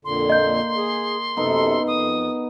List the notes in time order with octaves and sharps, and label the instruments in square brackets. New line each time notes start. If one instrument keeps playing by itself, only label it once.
[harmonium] F2 A#2 D3 [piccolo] C6
[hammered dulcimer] A#3 [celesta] D#5 G6
[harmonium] G#4
[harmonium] F#2 C3 A4 [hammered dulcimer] B3 D#4
[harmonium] F2 [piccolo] D#6